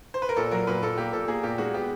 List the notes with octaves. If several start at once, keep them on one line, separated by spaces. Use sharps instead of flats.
C5
B4
A#4
A#2 A4
F#3 A#4
A#2 B4
A#2 A4
A#3 G4
A#2 A4
A#3 G#4
A#2 G4
G#3 F#4
B3 G4